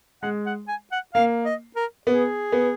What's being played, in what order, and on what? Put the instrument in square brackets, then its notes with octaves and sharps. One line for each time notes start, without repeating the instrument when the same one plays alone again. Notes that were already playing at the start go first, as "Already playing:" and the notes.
[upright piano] G#3 [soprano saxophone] F#5
[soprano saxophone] F#5
G#5
F#5
[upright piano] A#3 [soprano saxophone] F5
[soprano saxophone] D#5
A#4
[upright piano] B3 [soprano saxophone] G#4
[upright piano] B3